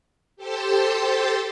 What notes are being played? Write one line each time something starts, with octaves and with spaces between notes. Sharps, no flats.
G4 A4 C5 G5 A5 C6